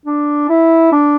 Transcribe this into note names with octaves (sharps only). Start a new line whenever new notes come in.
D4
E4
D4